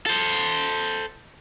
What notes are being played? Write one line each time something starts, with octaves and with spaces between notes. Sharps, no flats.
A4 C5